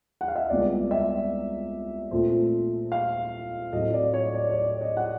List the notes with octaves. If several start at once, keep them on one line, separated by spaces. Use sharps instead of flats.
F#5
F5
E5
D#5
C2 C3 F3 G#3 B3 D5
E5
A#2 F3 A3 C4
F5
A2 F#3 A3 C4 D#5
D5
C#5
D5
C#5
D5
D#5
F#5